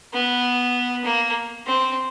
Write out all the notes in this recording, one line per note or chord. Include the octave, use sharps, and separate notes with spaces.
B3
A#3
C4